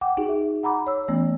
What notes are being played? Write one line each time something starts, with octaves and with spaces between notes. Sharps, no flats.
F#5 G5 D6
D#4 F#4 G#4
E5
F#5 A#5 B5 D6
C#5 E6
E3 A3 B3 C#4